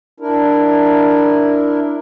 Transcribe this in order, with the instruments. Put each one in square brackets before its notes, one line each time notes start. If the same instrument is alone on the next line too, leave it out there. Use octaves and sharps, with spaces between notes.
[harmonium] D4 E4 A#4